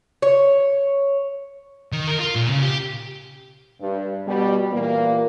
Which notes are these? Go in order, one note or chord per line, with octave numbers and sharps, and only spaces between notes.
C#5
D#3
A#4
F4
A#2
C#3
G4
G2
B2 G3
A#2 E3 A#3